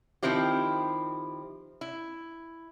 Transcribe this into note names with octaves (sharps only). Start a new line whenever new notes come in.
D#3 F3 C4 E4 G4
E4